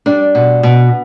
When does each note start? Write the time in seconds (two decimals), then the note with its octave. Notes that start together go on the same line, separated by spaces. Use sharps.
0.06 G3 D4
0.35 B2
0.63 B2